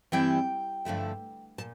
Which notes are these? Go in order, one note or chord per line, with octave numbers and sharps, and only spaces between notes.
G2 E3 G3 C4 E4 G5
G2 D3 F3 A3 E4
A#2 A5